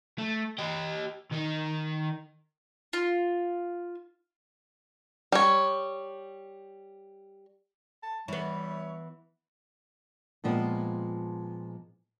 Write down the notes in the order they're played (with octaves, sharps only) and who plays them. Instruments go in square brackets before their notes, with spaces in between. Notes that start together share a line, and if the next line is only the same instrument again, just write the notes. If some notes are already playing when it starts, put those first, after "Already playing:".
[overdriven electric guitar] A3
G4 D#5
D#3 D#4
[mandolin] F4
[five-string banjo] G3 C#5
[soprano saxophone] A5
[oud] E3 B3 [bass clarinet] G3 [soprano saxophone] C#5
[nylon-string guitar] A#2 F3 G#3 B3 C4